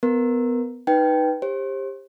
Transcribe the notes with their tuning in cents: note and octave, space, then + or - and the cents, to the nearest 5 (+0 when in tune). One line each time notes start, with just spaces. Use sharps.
B3 +20 A#4 +0
D#4 +0 B4 +0 G5 -5
G4 +20 C5 +35